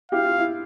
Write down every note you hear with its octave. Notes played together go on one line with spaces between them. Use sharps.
E4 G4 F5
F4
E4